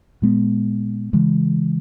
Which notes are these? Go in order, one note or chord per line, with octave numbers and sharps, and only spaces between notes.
A#2 G#3 B3
C#3 E3 G#3